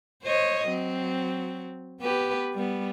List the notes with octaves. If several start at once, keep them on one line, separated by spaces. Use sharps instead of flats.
C5 C#5 D#5
F#3 C4
B3 G4 B4
G3 B3